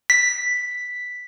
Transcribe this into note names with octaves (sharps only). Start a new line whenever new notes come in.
B6